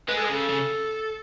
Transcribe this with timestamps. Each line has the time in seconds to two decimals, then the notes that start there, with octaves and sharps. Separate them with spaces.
0.08 G#3 B4
0.17 A4
0.25 G#4
0.29 C#3 A4
0.49 C#3